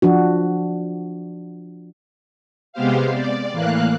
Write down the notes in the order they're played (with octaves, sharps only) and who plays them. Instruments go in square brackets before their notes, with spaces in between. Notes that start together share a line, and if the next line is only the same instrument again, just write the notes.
[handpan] F3 D4 F#4
[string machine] C3 G#3 B3 G4 C5 F5
D5
A2 E3 A#3 F5 F#6